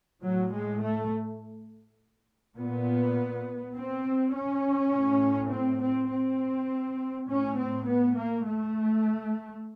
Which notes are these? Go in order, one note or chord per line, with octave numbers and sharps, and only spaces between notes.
A2 F#3
G#3
A3
A#2 B3
C4
C#4
A2
C4
C4
C4
A2 C#4
C4
B3
A#3
A3